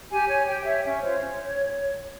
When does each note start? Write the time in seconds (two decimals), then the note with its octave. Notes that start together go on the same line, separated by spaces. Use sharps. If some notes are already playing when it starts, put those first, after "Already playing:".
0.11 G4 G#5
0.29 C#5 G#5
0.48 G4 G5
0.65 C#5 E5
0.84 C#4 E5
1.02 F4 C5 C#5
1.20 C#4